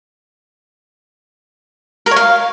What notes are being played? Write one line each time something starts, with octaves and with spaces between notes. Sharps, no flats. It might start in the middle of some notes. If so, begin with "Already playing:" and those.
A#4
C#5
F5